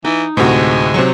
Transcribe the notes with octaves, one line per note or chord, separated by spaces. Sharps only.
E3 D#4
D2 A2 C3 G#3 F#4
C3 F#3 C4 C5 C#6